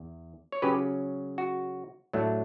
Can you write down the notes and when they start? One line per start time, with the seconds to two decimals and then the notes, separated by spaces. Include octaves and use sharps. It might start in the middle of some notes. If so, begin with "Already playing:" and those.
Already playing: E2
0.52 C#5
0.62 C#3 F#3 C#4 G4 B4
1.38 F#4
2.13 A2 F#3 A3 D4